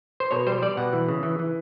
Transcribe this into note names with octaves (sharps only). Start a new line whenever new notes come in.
C5
B2 C#5
G3 C5
G3 D5
B2 F#5
E3
C#3
E3
E3